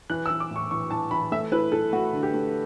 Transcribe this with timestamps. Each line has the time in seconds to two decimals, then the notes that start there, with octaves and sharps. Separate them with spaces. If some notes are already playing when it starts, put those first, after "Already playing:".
0.10 E3 F#6
0.26 E6
0.30 E3
0.40 D6
0.51 A2
0.56 C#6
0.71 E3 C#6
0.90 E3 A5
1.11 E3 B5
1.32 A3 E5
1.52 E4 B4
1.72 E4 A4
1.93 A3 F#4
2.13 D3
2.23 G4
2.34 A3